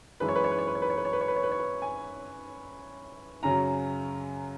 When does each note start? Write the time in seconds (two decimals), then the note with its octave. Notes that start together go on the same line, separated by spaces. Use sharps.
0.20 F#2 E3 G#3 B4
0.28 C#5
0.35 B4
0.44 C#5
0.52 B4
0.58 C#5
0.67 B4
0.75 C#5
0.82 B4
0.90 C#5
0.97 B4
1.05 C#5
1.13 B4
1.21 C#5
1.28 B4
1.36 C#5
1.43 B4
1.51 C#5
1.59 B4
1.82 G#5
3.43 F#2 C#3 F#3 A#5